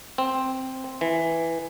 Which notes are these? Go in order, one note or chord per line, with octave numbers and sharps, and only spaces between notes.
C4
E3